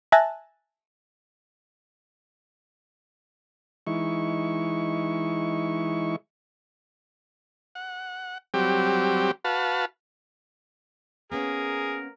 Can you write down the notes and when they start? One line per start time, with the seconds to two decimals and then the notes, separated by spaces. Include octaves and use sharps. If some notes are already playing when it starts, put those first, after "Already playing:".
0.12 E5 G#5 A5 F#6 A6 A#6
3.87 E3 G#3 D#4 E4 C#6
7.75 F#5
8.54 F#3 G3 C4 G4
9.44 F#4 B4 F5 A5
11.32 A#3 B3 C#4 G#4 A#4